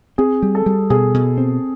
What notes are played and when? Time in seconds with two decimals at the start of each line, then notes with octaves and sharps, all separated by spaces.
0.18 C4 G#4
0.43 G3
0.55 A4
0.66 G3
0.90 B2 G#4
1.14 B2
1.38 C4